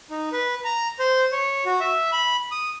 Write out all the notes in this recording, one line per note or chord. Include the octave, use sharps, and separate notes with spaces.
D#4
B4
A#5
C5
C#5
F#4
E5
B5
D#6